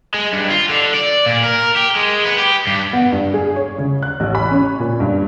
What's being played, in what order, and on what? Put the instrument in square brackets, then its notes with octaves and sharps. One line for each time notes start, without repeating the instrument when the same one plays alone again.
[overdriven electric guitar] G#3
G2
F4
D3
D5
A#2
A#4
G4
G#3
B3
G4
G2
[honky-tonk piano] B3
G2
G#4
C#5
C#3
F#6
A1
B5
C#4
A#2
G2